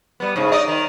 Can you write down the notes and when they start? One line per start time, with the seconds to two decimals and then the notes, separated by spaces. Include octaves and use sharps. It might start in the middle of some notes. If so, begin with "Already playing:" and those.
0.20 G3 B3
0.36 G#2 C#3
0.52 D#4 D5 D#5
0.68 D#3